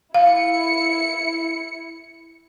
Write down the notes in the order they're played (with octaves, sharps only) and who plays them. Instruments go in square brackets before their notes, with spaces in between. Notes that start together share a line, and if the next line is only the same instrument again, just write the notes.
[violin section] E4 C#7 [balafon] F5